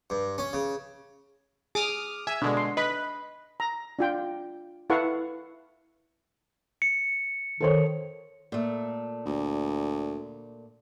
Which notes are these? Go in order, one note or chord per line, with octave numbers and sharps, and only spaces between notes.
G2
C#4
C#3
G#4 D6 D#6 F6
E5 G#5
B2 D3 G#3 D4
C6
B4 D#5 B5
A#5
D4 F4 G5
E4 A4 B4 F5 F#5 C#6
C#7
D#3 A4 C5 C#5
A#2 A3
D2